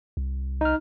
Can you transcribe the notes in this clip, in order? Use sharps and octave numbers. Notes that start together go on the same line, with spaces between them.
C2
D#4 F6